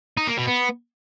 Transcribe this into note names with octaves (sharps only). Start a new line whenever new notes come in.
D#4
A#3
B2
B3